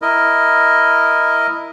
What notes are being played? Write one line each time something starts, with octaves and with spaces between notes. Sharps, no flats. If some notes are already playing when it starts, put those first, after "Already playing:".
E4 A#4 D#5